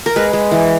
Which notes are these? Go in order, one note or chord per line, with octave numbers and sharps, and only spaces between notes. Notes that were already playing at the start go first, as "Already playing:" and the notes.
A#4
G#3 B4
G#3
E3